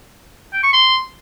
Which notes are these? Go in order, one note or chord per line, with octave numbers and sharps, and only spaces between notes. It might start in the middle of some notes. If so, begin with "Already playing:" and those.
G5
C#6
C6